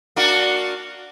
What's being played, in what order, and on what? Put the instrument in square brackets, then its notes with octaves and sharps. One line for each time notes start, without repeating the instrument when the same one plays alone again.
[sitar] A#3 D4 F#4